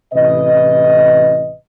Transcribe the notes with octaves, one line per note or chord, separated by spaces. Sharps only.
A1 C3 E3 B4 D#5